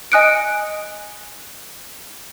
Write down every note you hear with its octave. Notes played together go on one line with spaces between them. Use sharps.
D#5 G#5 D#6 F#6 C#7 D7